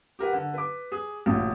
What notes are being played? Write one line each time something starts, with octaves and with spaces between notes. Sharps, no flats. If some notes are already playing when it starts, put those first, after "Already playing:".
G4 A#4 B4 F#5
D3
B4 D6
G#4
A1 D2 A#2